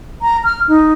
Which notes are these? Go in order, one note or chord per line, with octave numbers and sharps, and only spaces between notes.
A#5
F6
D#4